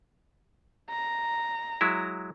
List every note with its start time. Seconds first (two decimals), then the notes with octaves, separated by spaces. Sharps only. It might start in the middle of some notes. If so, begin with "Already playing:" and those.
0.90 A#5
1.81 F#3 G#3 E4